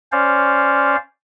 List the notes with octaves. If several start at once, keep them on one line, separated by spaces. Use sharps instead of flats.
C#4 C5 D5 F5